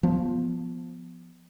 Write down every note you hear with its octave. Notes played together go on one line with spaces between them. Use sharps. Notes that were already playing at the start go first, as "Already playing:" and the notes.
F3 B3